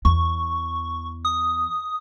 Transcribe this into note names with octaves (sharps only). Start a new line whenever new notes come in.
E2 C#6
D#6